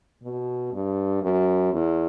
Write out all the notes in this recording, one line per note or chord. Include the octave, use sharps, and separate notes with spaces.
B2
G2
F#2
E2